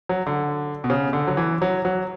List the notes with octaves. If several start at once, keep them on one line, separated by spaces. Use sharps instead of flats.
F#3
D3
B2
C#3
D3
F#3
E3
F#3
F#3